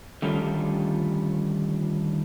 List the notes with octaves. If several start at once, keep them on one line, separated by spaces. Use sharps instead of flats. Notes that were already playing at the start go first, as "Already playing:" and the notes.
D3 D#3 G3 A3 C#4 F4